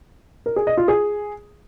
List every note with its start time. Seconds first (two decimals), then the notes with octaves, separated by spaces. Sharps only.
0.46 A#4
0.56 G#4
0.67 D#5
0.77 F4
0.88 G#4